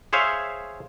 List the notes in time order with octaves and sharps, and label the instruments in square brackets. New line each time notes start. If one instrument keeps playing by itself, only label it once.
[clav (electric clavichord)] G#4 C5 C#5 E5 F5